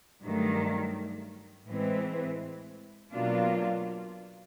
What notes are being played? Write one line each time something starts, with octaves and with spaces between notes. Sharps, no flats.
G2 D#3 F#3 A3
A2 E3 G#3 C4
B2 F#3 A#3 D4 F4